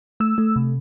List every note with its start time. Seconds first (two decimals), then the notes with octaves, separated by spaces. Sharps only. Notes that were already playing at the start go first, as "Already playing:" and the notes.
0.20 A3 E6
0.38 A3
0.56 C3